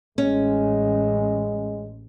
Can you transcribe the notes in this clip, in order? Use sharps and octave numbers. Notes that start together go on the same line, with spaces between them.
A1 G#3 C#4